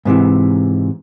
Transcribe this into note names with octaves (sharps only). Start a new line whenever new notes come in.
G#2 C3 D#3 E3